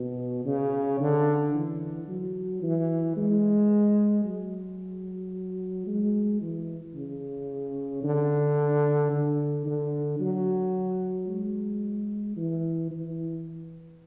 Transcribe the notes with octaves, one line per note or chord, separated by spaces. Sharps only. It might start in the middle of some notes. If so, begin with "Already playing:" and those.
Already playing: B2
C#3
D3
E3
F#3
E3
G#3
F#3
G#3
E3
C#3
D3
D3
D3
F#3
G#3
E3
E3